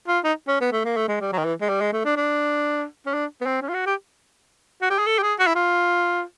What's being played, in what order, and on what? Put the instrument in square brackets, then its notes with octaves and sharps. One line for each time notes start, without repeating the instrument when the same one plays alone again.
[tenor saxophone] F4
D#4
C#4
B3
A3
A#3
A3
G#3
G3
F#3
D#3
E3
G#3
G3
G#3
A3
D4
D4
C#4
D4
B3
C4
C#4
F4
F#4
G4
F#4
G4
G#4
A4
G4
G#4
F#4
E4
F4